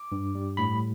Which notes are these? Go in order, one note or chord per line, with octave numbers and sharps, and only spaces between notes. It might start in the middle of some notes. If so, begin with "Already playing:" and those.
Already playing: D6
G2
G3
A2 B5